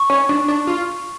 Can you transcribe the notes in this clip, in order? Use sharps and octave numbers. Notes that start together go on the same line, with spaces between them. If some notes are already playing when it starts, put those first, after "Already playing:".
Already playing: C#6
C#4
D4
D4
F4